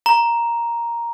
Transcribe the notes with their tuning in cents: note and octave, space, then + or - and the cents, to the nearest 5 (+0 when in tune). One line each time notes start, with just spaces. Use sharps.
A#5 +5